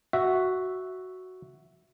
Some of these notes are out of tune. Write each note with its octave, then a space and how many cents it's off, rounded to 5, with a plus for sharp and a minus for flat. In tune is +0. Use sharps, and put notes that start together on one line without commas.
F#4 +0 E5 +0